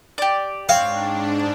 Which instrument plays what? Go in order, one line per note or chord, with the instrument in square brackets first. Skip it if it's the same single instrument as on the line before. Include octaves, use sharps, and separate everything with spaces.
[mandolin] G4 D5
[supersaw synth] G#2 D4 [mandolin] C4 C#5 [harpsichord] F5